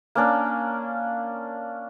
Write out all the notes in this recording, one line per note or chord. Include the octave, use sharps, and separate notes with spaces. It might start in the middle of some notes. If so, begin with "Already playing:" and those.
A#3 C#4 D4